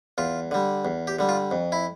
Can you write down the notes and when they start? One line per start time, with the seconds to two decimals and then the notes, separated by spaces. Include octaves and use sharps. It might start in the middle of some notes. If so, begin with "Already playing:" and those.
0.18 E2 F4
0.51 D3 G3
0.85 E2
1.07 G4
1.19 D3 G3
1.29 F4
1.51 F2
1.72 E4